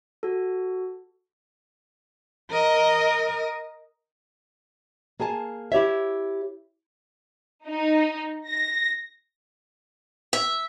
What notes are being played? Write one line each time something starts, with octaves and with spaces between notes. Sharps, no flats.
F#4 A4
A#4 D#5
A#3 G#4 G#5 A5
E4 G4 C#5 E5
D#4
A#6
E5